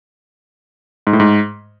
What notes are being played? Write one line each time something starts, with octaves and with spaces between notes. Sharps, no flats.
G#2
A2
G#2